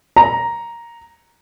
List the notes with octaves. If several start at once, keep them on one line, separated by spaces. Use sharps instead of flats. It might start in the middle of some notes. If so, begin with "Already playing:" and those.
A#5